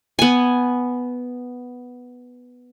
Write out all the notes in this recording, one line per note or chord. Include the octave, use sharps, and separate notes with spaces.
B3 G#5